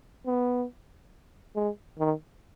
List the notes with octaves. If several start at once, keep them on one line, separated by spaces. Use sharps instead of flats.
B3
G#3
D#3